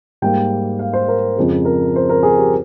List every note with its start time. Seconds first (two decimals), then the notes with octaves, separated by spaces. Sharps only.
0.22 G#2 G3 A#3 G5
0.79 F5
0.93 C5
1.08 A#4
1.36 F2 C#3 G#3
1.65 A#4
1.96 C5
2.09 A#4
2.23 G#4
2.38 G4